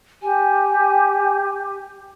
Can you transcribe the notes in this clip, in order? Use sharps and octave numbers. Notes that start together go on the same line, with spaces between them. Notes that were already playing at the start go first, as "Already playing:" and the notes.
G4 G#5